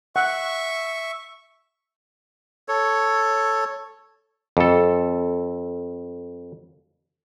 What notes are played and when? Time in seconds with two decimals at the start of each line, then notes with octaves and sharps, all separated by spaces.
0.16 E5 F#5 C#6
2.68 A4 C#5
4.57 F2 A4